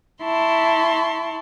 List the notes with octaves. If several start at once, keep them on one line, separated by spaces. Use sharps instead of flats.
E4 A5 C6 C#6